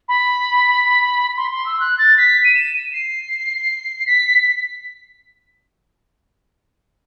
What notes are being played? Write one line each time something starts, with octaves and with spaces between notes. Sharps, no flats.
B5
C6
C6
E6
F#6
A6
B6
D#7
E7
D#7
C7
B6